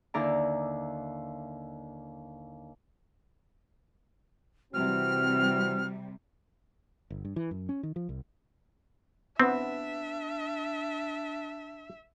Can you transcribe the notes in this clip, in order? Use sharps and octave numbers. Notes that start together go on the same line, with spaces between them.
D#2 D3 D4 E4 D5 A#5
C3 E3 G3 C4 F#4 F6
G1
G2
E3
F#2
C#4
D#3
F3
C2
B3 C4 D4 E5